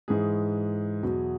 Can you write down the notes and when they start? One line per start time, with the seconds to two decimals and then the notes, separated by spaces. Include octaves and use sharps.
0.08 G#2 E3 G#3 G#4
1.03 E2 B2 F#3